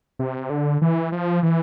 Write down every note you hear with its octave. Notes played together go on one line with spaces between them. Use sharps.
C3
D3
E3
F3
E3